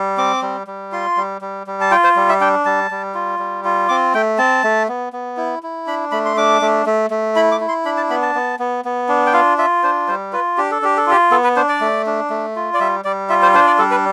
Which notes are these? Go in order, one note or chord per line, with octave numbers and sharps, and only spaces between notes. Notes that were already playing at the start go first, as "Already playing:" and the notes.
Already playing: G3
C4 D6
G3
G3
F4 C6
G3
G3
G3
A5
F4 G5
C5
G3
E5
D4 G5
G3 A5
G3
F4
G3
F4
C4 D6
A3 G5
C4 A5
A3
B3
B3
E4
E4
D4 B5
A3 B5
C6
D4 D6
A3
A3
A3
E4 B5
D6
E4
C6
D4 B5
A5
B3 B5
A5
B3
B3
B3
D4
G5
F4 F5
F4 E5
D4 C5
G3 C5
F4 B4
D4 G4
A4
D4 G4
A4
F4 G4
B3 A4
B4
D4 C5
D5
A3
D4
A3
F4
D5
G3 E5
G3 D5
F4 E5
C5
D4 C5
D5
G3 A4
B4